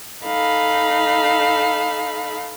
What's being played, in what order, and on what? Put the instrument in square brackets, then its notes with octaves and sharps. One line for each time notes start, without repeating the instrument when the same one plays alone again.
[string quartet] D#4 A4 F5 B5